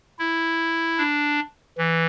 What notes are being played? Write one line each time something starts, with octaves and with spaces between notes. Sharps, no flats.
E4
D4
E3